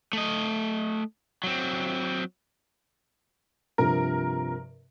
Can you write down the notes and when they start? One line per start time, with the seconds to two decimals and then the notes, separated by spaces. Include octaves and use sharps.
0.13 A3 D#5
1.43 F#3 C4
3.78 G2 C3 F3 A#4